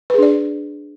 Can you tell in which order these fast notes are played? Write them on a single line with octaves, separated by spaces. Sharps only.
B4 G#4 D4 D5